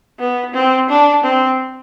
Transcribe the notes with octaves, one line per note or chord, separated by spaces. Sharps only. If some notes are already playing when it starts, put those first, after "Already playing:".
B3
C4
D4
C4